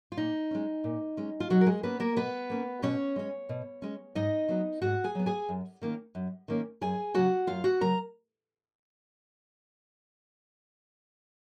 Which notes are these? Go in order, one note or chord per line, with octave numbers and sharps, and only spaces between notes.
F4
A#2 D#4
G#3 C#4
A#2
G#3 C#4
F4
B2 F#3 F#4
A#4
G#3 G#4
A#3 B3 C#4 B4
A#3 A#4
B2 B3 B4
A#3 C#4
B2 C#4 C#5
G#3 C#4
B2
G#3 C#4
G#2 D#4 D#5
F#3 B3
G#2 F#4 F#5
G#4 G#5
F#3 B3
G#4 G#5
F#2
D#3 A#3 C#4
F#2
D#3 A#3 C#4
F#2 G#4 G#5
C#3 F#3 F#4 F#5
F#2 F4 F5
F#4 F#5
C#3 F#3 A#4 A#5